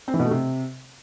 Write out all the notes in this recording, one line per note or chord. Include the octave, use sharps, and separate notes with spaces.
C4
E3
B2
A3
C3